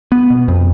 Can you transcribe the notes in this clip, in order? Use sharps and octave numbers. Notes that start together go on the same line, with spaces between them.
B3
B2
F2